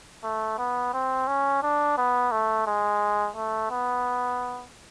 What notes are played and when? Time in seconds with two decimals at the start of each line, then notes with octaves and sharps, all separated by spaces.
0.24 A3
0.59 B3
0.93 C4
1.28 C#4
1.63 D4
1.98 B3
2.32 A3
2.67 G#3
3.36 A3
3.71 B3